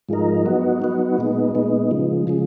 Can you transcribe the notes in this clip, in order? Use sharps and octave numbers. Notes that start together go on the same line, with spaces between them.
G#2 F3 G#3 D#4 A#4
F#3 B3 D#4 F#4
F#3 B3 D#4 F#4
A#2 G#3 B3 D#4
A#2 G#3 B3 D#4
C#3 F3 G#3
C#3 F3 G#3